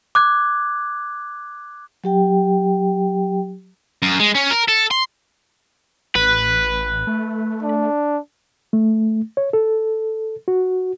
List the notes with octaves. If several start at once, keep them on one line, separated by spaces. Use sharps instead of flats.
D6 F#6 G#6
F#3 G4 G5
F#2
G#3
C#4
A#4
A4
C6
A1 B4
A3
D4
A3
C#5
A4
F#4